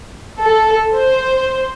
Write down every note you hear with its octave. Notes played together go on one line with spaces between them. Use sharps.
A4
C5